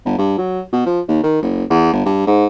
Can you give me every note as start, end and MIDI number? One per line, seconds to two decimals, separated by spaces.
0.06 0.15 31
0.18 0.35 43
0.38 0.62 54
0.73 0.85 47
0.86 1.00 53
1.08 1.23 39
1.23 1.42 51
1.42 1.64 30
1.70 1.92 40
1.93 2.03 31
2.05 2.23 43
2.27 2.46 44